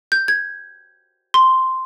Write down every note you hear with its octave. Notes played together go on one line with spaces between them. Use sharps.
G6
G#6
C6